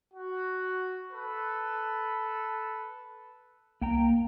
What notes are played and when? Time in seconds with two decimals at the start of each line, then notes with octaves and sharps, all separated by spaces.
0.14 F#4
1.12 A4 B4
3.81 C2 A#3 G5 A#5